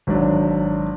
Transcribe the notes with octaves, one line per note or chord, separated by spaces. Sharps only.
G#1 F#3 D4